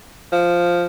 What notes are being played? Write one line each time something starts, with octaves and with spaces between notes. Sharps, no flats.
F3